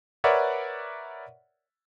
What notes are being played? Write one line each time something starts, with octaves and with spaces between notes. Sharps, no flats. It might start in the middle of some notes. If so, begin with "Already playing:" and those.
A#4 B4 C#5 D5 E5 F#5